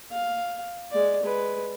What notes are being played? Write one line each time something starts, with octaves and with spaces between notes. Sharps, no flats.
F5
G#3 D5
G#3 B4